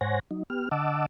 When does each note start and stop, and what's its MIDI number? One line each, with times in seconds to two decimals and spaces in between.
0.01 0.20 44
0.01 0.20 72
0.01 0.20 73
0.01 0.20 78
0.01 0.20 80
0.01 0.20 94
0.31 0.43 54
0.31 0.43 63
0.50 0.69 59
0.50 0.69 67
0.50 0.69 89
0.71 1.06 50
0.71 1.06 75
0.71 1.06 78
0.71 1.06 81
0.71 1.06 86
0.71 1.06 88